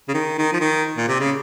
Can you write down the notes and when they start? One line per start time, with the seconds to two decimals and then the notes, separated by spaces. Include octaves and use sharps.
0.08 C#3
0.14 D#3
0.38 D#3
0.53 F3
0.60 D#3
0.97 A#2
1.08 C3
1.19 C#3